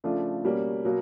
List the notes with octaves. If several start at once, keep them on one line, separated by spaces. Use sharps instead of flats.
C#3 F3 A3 D4 F4
B2 G3 A#3 C#4
B2 F#3 A#3